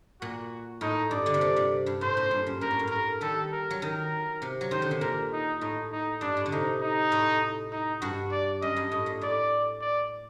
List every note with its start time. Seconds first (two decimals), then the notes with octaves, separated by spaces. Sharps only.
0.21 A#2 F#4
0.81 A2 D#4
1.11 G2 D5
1.26 D3
1.34 C3
1.41 A#2
1.56 C3
1.86 G2
2.01 A2 C5
2.17 A#2
2.31 G2
2.47 F#2
2.61 A#2 A#4
2.71 A2
2.79 G2
2.87 A2 A#4
3.21 D#3 G3 A4
3.52 A#4
3.71 F#3
3.81 D#3 A#4
4.42 C3
4.61 F#3
4.71 D#3 C5
4.82 D3
4.91 C3
5.01 A#2 A#4
5.32 D#4
5.61 A2 D#4
5.92 D#4
6.21 G2 D4
6.37 A2
6.46 D3
6.52 C3 D#4
6.81 D#4
7.12 A2
7.72 D#4
8.01 G2 F#4
8.31 D5
8.62 F#2 D#5
8.76 G2
8.91 A2 D#5
9.06 A#2
9.21 A2 D5
9.81 D5